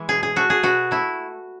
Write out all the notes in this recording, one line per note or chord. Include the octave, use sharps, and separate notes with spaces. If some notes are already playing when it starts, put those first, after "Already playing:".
Already playing: E3 G#3
B2 G#4
G#4
A3 F#4
G#4
B2 F#4
A3 E4